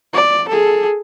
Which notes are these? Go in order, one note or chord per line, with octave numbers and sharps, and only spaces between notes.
D5
G#4 A4